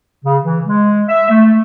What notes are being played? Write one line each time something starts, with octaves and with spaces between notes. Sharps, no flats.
C#3
E3
G#3
E5
A3